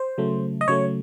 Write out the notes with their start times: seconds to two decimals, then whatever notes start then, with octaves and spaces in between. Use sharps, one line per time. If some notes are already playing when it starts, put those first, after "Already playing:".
Already playing: C5
0.18 C#3 F#3 A3
0.61 D#5
0.68 C#3 F#3 A3 C#5